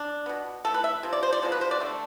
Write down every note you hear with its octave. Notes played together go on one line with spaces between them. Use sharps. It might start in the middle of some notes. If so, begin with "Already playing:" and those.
Already playing: D4
B2 B3
E3 A3 A4
B4
E5
C3 F3
D5
C5
D5
C3 F3 G#3 B3
B4
C5
D5
D3 A3